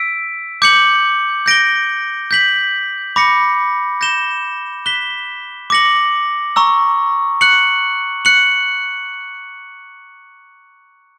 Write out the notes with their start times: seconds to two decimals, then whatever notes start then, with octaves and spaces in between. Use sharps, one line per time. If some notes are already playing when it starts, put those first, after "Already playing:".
Already playing: E6 B6 D7
0.62 D6 G6 C#7 F#7
1.46 G6 A#6 D7 G7
2.31 G6 B6 F#7
3.16 B5 D6 A#6 C#7
4.01 G6 A#6 E7 G7
4.86 F#6 B6 E7 G7
5.70 D6 A#6 C#7 F#7
6.56 A#5 C#6 E6
7.41 F#6 C#7 F#7
8.25 F#6 C#7 F#7